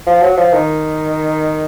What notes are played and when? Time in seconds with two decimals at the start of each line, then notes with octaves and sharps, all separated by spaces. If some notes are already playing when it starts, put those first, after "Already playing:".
0.07 F3
0.22 F#3
0.37 F3
0.53 D#3